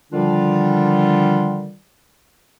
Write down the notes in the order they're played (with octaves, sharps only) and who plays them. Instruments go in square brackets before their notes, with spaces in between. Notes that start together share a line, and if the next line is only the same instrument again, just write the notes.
[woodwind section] D3 D#3 F3 G3 D4 F4